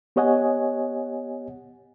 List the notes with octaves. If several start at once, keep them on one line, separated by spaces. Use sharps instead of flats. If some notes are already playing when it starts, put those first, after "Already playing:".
B3 G4 C#5 D#5 F#5 G#5